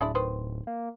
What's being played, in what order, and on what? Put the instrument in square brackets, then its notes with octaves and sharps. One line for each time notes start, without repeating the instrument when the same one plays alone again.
[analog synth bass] D1 [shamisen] G#3 D4 E4
[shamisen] D#3 B4 C5
[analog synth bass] A#3